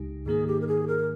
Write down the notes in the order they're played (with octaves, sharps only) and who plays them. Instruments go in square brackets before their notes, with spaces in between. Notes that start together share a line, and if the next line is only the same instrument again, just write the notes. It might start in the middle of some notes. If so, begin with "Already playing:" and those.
Already playing: [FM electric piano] C#2 C#3 G#3 D#4 G4
[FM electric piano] G#2 D#3 A#3 D#4 [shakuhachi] G#4
[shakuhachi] G4
A#4
G#4
A#4